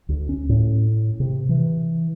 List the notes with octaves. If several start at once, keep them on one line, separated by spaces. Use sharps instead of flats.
D2
C#4
A2
C3
E3